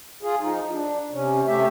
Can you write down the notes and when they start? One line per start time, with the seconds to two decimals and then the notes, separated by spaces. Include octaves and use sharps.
0.23 F4 G#4
0.40 F3 D#4
0.71 D4
1.11 C3 C#4
1.47 C3 A3 G4 E5